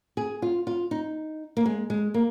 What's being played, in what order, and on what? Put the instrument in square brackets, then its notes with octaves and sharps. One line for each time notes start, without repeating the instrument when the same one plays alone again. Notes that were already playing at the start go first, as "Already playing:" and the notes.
[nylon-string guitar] G#4
F4
F4
D#4
A#3
G#3
G#3
A#3